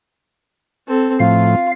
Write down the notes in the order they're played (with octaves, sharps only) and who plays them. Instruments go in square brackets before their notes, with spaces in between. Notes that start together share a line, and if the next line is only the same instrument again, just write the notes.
[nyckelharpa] C4 A4
[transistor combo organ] A2 F3 [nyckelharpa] F4 [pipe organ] F5